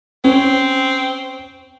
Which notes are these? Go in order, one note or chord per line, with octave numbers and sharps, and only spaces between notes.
C4 C#4